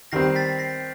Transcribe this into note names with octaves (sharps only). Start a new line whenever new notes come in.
D#3 G3 C4 A#6 C7
A6 B6
A#6 C7